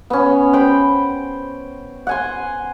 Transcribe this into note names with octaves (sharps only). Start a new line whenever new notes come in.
B3 C#4
C5 G5 B5
F#5 G#5 C6